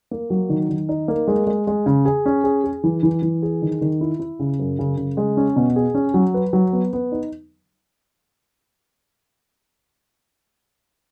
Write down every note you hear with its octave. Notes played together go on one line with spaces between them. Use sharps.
A#3
F#3
D#3
D#3
D#4
A#3
G#3
G#3
G#3
C#3
G#4
C#4
G#4
G#4
E3
E3
E3
G#4
D#3
D#3
E4
E4
C#3
F#2
C#3
C#3
G#3
C#4
B2
G#4
C#4
F#3
B4
F#3
B3
B3
D#4